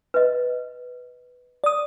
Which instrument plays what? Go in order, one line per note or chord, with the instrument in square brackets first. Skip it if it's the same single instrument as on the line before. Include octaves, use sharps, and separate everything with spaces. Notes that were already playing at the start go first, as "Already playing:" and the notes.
[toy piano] B4 D#5
[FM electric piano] D5 D#6